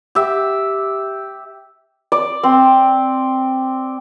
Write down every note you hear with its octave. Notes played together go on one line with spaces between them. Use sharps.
G4 E5
D5
C4